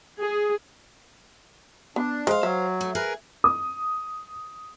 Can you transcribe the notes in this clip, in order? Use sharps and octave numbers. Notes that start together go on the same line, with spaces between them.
G#4
B3 D4
G#3 C5 F5
F#3 E5
A3
G#4 A#4 B4
D#6